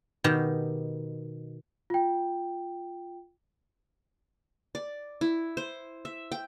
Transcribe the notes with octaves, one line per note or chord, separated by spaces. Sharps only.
B2 D#3 G4
F4 G5
D5
E4
C5
E5
G5